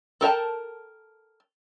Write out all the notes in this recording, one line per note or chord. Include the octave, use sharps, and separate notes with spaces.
A4 A#4 G5 A5